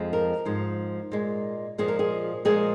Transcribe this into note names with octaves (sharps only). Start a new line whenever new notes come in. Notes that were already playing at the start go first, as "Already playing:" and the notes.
Already playing: F2 F3 G#3
A#4
G#2 F3 G#3
A#2 G#3
A#2 F3 G#3 G#4
A#4
G#4
A#2 F3 G#3 G#4